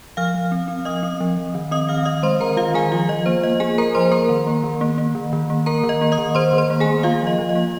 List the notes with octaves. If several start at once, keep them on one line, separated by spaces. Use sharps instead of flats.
F3 F5 F6
F3
C4
C4
F3 D#5 D#6
C4
F3
F3
D#3
C4 D#5 D#6
D#3 F5 F6
D#3 D#5 D#6
G#3 C5 C6
D#3 A#4 A#5
D#3 F4 F5
D#3 G#4 G#5
F3 F4 F5
F3 D#5
A#3 C5
A#3 D#5
A#3 G#4 G#5
A#3 A#4 A#5
F3 C5 C6
A#3 A#4 A#5
D#3
A#3
D#3
A#3
A#3
D#3
D#3
A#3
A#3 A#4 A#5
D#3
D#5
A#3
D#5 D#6
D#3
D#3 C5 C6
D#3
C5 C6
A#3
G#4 G#5
A#3
A#3 F4 F5
F3
D#5
F3
D#5
A#3